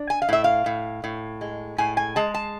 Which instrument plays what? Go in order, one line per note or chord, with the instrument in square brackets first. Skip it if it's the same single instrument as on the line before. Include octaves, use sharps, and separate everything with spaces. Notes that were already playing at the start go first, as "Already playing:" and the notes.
Already playing: [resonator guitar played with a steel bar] D4
G#5
F5
A2 E5
F5
A2
A2
G#3
A2 G#5
G#5
G#3 A5
A5